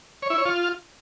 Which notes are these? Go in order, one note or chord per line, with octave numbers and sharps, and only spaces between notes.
C#5
E4
C#5
F4